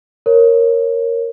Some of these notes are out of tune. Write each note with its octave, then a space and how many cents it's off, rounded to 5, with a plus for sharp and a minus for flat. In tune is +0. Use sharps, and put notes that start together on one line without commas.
A#4 +0 C#5 -10